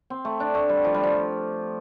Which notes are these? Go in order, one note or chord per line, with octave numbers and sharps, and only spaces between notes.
C4
A3
D4
A3
G3
F3
G3
F3